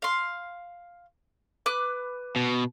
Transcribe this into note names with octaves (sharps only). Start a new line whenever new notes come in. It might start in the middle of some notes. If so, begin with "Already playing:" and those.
F5 C6
B4 D6 F#6
B2